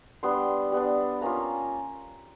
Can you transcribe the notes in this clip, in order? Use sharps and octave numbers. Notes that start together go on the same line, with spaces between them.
G3 B3 D4 C6
G3 B3 D4
A#3 C#4 F4 A#5